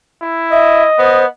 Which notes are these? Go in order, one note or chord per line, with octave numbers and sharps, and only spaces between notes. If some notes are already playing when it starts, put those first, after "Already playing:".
E4
D#5 E5
B3 C5